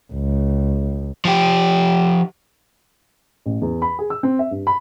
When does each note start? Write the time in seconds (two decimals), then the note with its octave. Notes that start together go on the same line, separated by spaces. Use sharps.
0.13 C#2
1.25 F3 G4
3.46 A1
3.62 E2
3.82 B5
3.99 G#4
4.10 E6
4.23 C4
4.39 E5
4.51 G2
4.67 B5